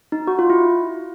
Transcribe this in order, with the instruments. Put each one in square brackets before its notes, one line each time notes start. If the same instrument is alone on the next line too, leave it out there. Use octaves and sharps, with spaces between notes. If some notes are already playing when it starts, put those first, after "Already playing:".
[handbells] D#4
F#4
F4
E4